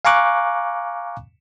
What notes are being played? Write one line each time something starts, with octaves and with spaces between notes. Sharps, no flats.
F5 G#5 A#5 C#6 D6 F#6